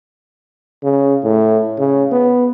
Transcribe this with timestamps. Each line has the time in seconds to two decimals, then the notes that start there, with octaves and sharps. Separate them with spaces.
0.83 C#3
1.24 A2
1.79 C#3
2.12 B3